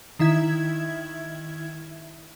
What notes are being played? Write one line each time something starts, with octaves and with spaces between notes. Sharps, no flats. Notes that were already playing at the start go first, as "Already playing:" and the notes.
D#3 E4 E5 G#6